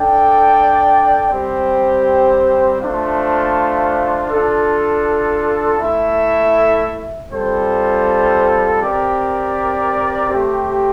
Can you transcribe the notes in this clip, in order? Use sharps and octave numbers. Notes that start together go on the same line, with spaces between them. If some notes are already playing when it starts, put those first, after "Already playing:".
Already playing: D4 A4 D5 G5
G3 C4 G4 C5
A3 D4 F4 C5 F5
D4 F4 A4
A3 E4 A4 E5
G3 C4 F4 A4 C5
C4 G4 A#4 D5
A3 C4 G4